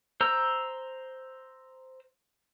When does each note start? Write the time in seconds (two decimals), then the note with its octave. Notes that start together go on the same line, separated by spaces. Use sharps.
0.21 C5 A#5 E6